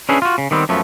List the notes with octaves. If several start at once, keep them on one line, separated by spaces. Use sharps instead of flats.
C#4 D4 E4 G#4 B4
F4 F#4
C#3
D#3 G3 B3 C4
F#2 F3 A3 B3